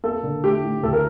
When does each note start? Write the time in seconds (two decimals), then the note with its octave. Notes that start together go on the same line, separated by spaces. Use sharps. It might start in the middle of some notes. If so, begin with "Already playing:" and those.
0.04 A#3 A4
0.23 D3
0.44 A3 G4
0.64 A2
0.83 D2 A4
0.93 A#4